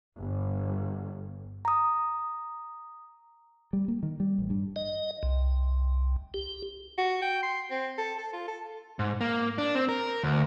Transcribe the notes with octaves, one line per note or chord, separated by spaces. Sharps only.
G1
A#5 D#6
G3
A#3
D#3
G3
A1
G2
D#5
C2
G4
F#4
G5
C6
C4
A4
A4
F4
A4
G#2
A#3
D4
C4
A#4
D2